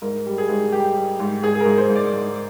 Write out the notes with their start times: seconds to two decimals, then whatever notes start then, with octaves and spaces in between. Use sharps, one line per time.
0.02 G#2 A#4
0.26 G3
0.38 G#4
0.49 G#2
0.72 G3 G4
0.95 G3
1.20 G#2
1.43 G#2 G#4
1.55 G#4
1.60 A#4
1.66 G#2
1.78 C5
1.90 G#2
1.95 D5
2.13 G#2